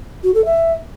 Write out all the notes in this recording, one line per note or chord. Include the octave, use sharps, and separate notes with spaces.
F#4
A4
E5